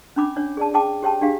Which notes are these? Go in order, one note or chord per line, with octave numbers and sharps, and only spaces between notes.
C#4 D4 B5 D6
D4 C#5
G#4 D5 A5
G#4 G5 A5 D6
G4 C#5 G5 A5
D4 G4 G#4 F5